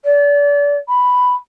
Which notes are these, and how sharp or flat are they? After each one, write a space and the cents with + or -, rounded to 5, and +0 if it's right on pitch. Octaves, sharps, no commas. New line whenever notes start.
D5 -35
B5 +5